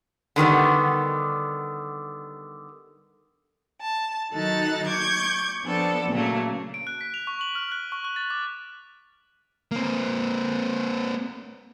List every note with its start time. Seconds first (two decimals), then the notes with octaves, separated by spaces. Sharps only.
0.36 D3 D#3 G3 B3
3.81 A5
4.33 D#3 F#3 D#4 A4 F#6 A6
4.87 C#6 D6 G6 G#6
5.64 F3 B3 D4 A4
6.12 A#2 C#3 F#3 A3 A#3
6.74 D7
6.87 F#6
7.01 B6
7.14 F7
7.27 C#6
7.41 F#7
7.55 F6
7.72 F#6
7.92 C#6
8.05 F#6
8.16 A6
8.30 D6
9.71 A#3 C4